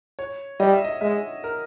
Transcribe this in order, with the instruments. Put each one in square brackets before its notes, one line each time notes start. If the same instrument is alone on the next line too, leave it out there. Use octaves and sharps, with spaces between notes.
[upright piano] C#5
[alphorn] G3 [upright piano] D#5
[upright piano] E5
D#5
[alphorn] G#3 [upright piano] E5
[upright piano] A#4